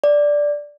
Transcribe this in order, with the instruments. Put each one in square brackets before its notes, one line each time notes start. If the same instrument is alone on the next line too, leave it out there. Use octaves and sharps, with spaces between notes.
[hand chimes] D5